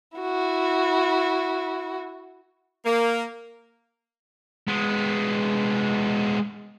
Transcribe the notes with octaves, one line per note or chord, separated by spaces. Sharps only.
E4 F#4
A#3
G#3 B3